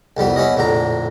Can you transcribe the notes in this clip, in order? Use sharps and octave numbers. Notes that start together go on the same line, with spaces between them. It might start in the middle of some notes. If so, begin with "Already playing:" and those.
C2 F2 G3 B3
B3 C#4 E4 D#5
A#1 F2 A2 D3 A#5